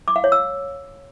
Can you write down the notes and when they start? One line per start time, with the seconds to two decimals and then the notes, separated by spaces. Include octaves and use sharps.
0.08 D6
0.16 F5
0.24 C#5
0.32 E6